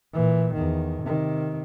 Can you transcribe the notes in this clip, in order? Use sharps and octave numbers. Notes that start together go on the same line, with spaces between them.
A#2 E3
E2 D#3
C3 D#3